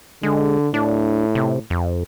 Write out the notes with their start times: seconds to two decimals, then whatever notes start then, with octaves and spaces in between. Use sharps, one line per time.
0.23 D3 G#3
0.74 A2 D4
1.35 C3
1.70 F2